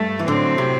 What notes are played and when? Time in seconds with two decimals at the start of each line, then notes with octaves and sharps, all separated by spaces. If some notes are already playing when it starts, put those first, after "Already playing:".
Already playing: G2 A3
0.19 E3
0.28 A2 D3 F#3 C4
0.58 C3